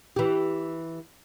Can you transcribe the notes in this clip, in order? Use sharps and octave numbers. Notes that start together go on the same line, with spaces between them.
E3 G4